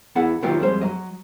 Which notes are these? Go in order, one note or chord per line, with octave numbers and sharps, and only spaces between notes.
E2 B3 E4 G#4 F#5
D#3 E3 F#3 A#3 F4 G4
F2 G3 G#3 C5
F#3 D#5